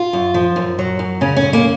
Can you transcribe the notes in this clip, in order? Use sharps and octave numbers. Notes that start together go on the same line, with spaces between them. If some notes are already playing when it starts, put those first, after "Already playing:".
Already playing: F4
F#2
F3
F#2
F#3
F#2
C#3 C#4
C#4
F#2
A#3